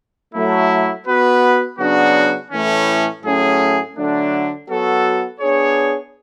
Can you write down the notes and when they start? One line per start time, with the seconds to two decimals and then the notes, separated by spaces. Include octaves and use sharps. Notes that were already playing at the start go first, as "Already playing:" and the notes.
0.35 F#3 A3 E4
1.07 B3 F#4 B4
1.79 C#3 F#3 B3 D4 F#4
2.50 A2 E3 A3 C#4
3.23 A2 F#3 A3 C#4 G#4
3.96 D3 F#3 A3 D4
4.68 F#3 B3 F#4 A4
5.40 B3 D4 G#4 C#5